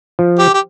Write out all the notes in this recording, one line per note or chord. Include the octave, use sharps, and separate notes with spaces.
F3
G4
G4